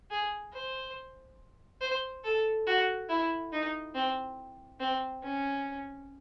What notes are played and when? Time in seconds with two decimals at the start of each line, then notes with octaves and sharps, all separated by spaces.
0.11 G#4
0.53 C5
1.81 C5
2.24 A4
2.67 F#4
3.09 E4
3.52 D#4
3.95 C4
4.80 C4
5.23 C#4